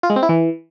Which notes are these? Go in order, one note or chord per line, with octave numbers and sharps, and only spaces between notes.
F4
G#3
C4
E4
E3